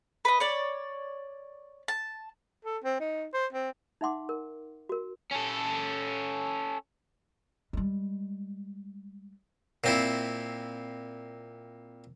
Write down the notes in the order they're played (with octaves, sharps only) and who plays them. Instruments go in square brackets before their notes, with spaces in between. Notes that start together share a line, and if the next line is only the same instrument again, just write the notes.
[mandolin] B4 D#5
C#5 D5
A5
[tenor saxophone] A4
C4
D#4
C5
C4
[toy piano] D#4 E5 F#5 C6 D6
A#4
F#4 A#4
[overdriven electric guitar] C#4 A4
[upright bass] G3 G#3
[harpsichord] A#2 C4 E4